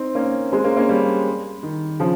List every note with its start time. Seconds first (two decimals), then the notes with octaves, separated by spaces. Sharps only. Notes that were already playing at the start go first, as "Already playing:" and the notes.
Already playing: C4 D#4
0.15 A#3 C#4
0.52 G#3 C4
0.64 A#3 C#4
0.77 A#3 C#4
0.89 G3 A#3
1.63 D#3
2.00 C#3 F3